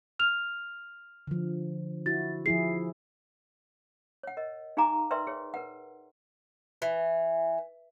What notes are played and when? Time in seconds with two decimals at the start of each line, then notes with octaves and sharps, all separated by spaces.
0.19 F6 F7
1.27 D3 F3
2.06 E4 F#4 A6
2.46 F3 E4 G#4 C7
4.23 C#5 F#5
4.37 A#4 D#5
4.77 D#4 G#4 F5 G#5 A#5 D6
5.11 A#4 B4 D5 E5 G5 C6
5.27 G#4 C#5
5.54 A#4 B4 F#5
6.82 E3